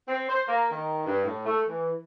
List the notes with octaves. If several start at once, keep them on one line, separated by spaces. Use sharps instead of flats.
C4
C5
A#3
D#3
G2
A2
A3
E3